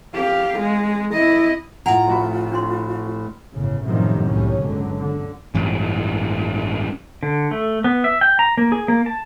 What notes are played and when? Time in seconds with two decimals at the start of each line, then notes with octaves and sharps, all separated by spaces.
0.15 G4 F5
0.59 G#3
1.13 E4 D#5
1.86 A2 F4 D5 F#5 G#5 A#5
2.07 F1 F#4 B5
2.52 D4 C#5 C6
3.53 G1 A2 C#3
3.84 F#2 A2 C3 D#3 F3 G3
4.25 C2 A2 F#3 G3 C#4
4.58 G1 C#2 D3 F#3
4.96 D3
5.55 A1 G2
7.23 D3
7.51 A3
7.84 B3
8.04 E5
8.21 G5
8.39 A#5
8.57 A#3
8.72 G#4
8.88 A#3
9.06 A5